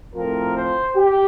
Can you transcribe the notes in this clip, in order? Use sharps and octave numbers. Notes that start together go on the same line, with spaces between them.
A2 F3 C4 A#4
C5
G4